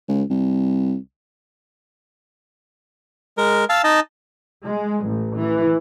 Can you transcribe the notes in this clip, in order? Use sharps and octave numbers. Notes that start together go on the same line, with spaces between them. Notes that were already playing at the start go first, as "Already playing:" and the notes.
C#2
C2
G#3 A#4
F5 A5 E6
D#4 D#5 A5
G#3
A1
E3